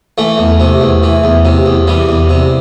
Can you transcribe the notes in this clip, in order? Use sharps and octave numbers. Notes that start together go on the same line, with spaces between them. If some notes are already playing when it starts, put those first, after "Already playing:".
E3 A3
E2
C3
E2
E3
E2
C3
E2
E3 G3
E2
C3